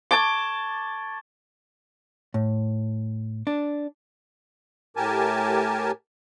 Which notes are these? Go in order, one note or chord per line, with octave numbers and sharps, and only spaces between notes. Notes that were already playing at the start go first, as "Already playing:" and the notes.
A5 C#6 D6 G#6 G7
A2
D4
A2 G4 A#4 G#5 A5